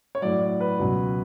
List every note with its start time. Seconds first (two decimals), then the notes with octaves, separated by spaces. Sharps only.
0.15 C#5
0.22 A2 F#3 D5
0.41 D5
0.60 B4
0.79 C#2 B2 F#3